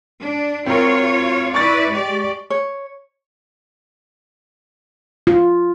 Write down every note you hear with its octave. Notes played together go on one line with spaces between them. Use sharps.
D4
C4 F4 F#4 A#4 C#5
E4 B4 D5 C#6 A6
G#3 G4 D5
C#5
F4